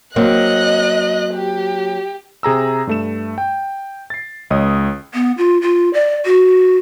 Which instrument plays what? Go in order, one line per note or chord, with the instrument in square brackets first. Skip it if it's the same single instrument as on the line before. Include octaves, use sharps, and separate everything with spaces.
[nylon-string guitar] F#3 A#3 C4 [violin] D#5 F#6
[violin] G4
[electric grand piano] C3 G#4 A#5 E6
G2 A3 E7
G5
A6 C7
C#2 C#5 D#5 D#6
[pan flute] B3
F4
F4
D5
F#4